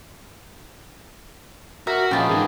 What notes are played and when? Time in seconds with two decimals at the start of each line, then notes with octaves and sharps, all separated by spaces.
1.87 F#4 A#4 E5
2.11 A#2 F3 G#3 A#3 B3 C#4 G5 A5
2.29 G#2 E3 F3